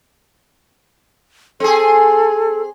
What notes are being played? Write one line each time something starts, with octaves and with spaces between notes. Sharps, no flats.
C4 G#4 A4